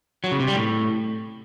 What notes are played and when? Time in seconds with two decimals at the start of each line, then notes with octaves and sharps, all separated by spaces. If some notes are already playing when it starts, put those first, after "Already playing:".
0.24 F#3
0.32 C#3
0.40 C3
0.47 G3
0.55 A2